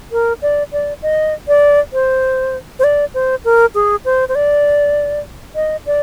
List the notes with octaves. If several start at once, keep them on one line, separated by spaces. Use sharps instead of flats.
A#4
D5
D5
D#5
D5
C5
C5
D5
C5
A#4
G#4
C5
C5
D5
D#5
D5